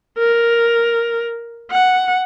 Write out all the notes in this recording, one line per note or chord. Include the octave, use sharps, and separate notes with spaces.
A#4
F#5